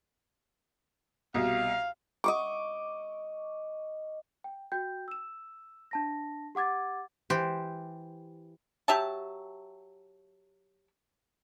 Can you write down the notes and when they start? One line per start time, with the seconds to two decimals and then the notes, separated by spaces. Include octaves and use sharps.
1.34 C2 B2 F5
2.24 D#5 C#6 D6
4.44 G5
4.72 F#4 G5 G6
5.08 E6 E7
5.91 D4 A5 A#6
6.55 G4 F#5 D6 G#6 A6
7.30 E3 G4 C5
8.88 F#3 G4 E5 A5